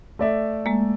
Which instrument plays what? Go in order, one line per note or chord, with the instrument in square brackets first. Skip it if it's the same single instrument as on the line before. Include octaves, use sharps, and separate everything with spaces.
[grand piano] A3 D5 E5
[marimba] G#3 A#3